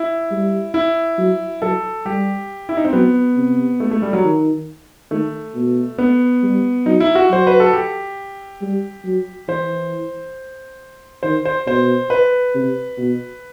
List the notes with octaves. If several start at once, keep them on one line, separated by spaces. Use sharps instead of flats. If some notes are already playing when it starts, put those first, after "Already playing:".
Already playing: E4
G3
E4
F#3
F#3 A4
G3 G4
E4
D#4
C4
F#3 B3
C3
A3
A3
G3
F#3
D#3
D#3 A3
B2
B3
G3
F#3 D#4
E4
F#4
F#3 C5
B4
A4
G4
G3
F#3
E3 C5
D#3 C5
C5
B2 C5
B4
C3
B2